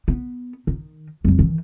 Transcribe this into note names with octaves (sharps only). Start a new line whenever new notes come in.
B3
D#3
F2 F#3
D#3 E3